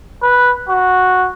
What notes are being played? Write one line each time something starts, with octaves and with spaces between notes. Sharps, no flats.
B4
F#4